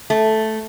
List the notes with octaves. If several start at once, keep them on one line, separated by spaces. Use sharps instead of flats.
A3